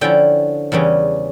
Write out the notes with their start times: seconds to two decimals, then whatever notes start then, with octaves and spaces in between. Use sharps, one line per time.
0.01 D3 F3 C#4 E4 G5
0.72 E2 C#3 E3 G3 C#4